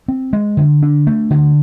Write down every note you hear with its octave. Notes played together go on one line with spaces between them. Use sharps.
C4
G#3
D3
D4
A3
D3